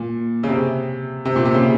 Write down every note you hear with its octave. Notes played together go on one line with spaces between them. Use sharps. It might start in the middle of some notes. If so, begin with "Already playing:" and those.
Already playing: A#2
C#3
C3
C3
A#2
C3
C#3